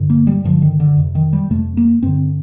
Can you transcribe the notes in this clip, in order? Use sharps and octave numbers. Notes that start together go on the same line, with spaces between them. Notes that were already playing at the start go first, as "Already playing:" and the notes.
Already playing: G2 D3
A#3
G3
G2 D3 F3
D#3
D3
F2 C3
D#3
G3
F2 C3 A3
A#3
G2 D3 C4